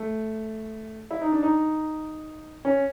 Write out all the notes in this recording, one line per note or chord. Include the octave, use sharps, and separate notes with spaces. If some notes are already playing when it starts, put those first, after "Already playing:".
Already playing: A3
E4
D#4
D4
D#4
C#4